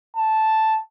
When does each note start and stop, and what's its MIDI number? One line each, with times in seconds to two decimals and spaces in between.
0.16 0.79 81